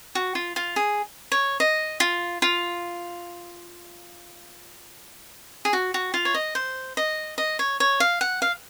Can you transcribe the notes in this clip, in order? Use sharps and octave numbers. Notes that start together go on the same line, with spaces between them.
F#4
F4
F4
G#4
C#5
D#5
F4
F4
G#4
F#4
F#4
F4
C#5
D#5
C5
D#5
D#5
C#5
C#5
F5
F#5
F5